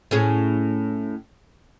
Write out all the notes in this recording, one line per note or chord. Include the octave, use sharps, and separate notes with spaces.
A2 C#4 G#4